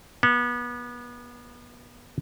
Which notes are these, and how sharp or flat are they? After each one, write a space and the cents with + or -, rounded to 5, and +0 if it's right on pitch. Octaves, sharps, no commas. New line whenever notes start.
B3 -30